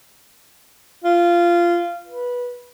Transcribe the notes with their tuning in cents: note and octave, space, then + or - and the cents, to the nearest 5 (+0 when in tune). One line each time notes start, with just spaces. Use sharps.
F4 -15
B4 -15